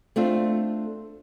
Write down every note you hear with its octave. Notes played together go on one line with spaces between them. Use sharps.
A3 C4 D4 F4